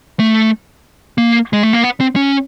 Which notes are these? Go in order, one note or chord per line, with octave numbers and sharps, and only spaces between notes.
A3
A#3
G#3
A3
A#3
B3
C4
C#4